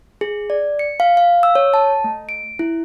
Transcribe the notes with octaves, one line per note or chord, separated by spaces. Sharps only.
G#4
D5
C#7
F5
F5
E6
C#5
A5
A3
D7
E4